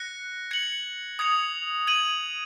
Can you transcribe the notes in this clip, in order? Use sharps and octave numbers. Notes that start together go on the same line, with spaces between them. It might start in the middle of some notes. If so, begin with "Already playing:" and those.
Already playing: F#6 A#6 C#7
G#6 C#7 F#7
D#6 G#6 C#7 F7
G#6 D#7 F#7